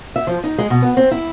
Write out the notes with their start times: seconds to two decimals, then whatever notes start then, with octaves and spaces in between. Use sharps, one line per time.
0.16 E5
0.27 F3
0.44 D#4
0.58 G#3
0.70 B2
0.82 B3
0.97 C4
1.11 E4